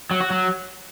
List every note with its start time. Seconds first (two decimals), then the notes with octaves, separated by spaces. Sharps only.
0.11 F#3
0.21 F#4
0.30 F#3